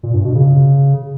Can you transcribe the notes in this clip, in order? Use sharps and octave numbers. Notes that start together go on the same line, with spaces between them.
A#2
G2
B2
C#3